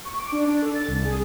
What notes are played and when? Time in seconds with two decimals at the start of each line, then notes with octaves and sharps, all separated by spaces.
0.05 C#6
0.18 D6
0.32 D4
0.47 D4
0.62 A4
0.74 A6
0.88 C2
1.05 G#4